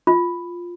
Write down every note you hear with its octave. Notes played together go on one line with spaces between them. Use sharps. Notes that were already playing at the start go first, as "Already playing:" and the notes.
F4